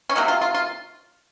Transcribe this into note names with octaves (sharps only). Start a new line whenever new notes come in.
C#4
C3 F#3 A#3 D#4
F4
F4
F4